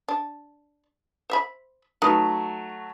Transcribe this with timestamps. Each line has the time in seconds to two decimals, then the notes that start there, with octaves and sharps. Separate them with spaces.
0.08 D4
1.30 C5 E5 B5
2.02 F#3 A3 D#4 F4 B4